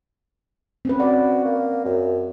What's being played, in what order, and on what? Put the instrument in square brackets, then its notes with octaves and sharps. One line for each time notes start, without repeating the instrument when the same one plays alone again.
[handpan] C4 C#4 B4
[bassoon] F#4 [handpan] D5
[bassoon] A#3
F#2